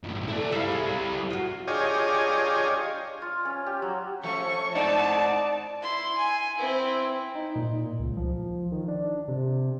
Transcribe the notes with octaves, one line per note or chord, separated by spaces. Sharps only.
B1 A2
E4 A4 D5
G3 E4 E5 F5
G#4
F4 F#4
D4 F4 G4 G#4 C#5 D#5
F4
C#4
G4
F#3
F3 A3 C#4 C#6
G#2 C4 D#4 D5 A5
E4 C6
G#5
C4 E4
D#4
A#2
C#2
F3
D#3
D4
C3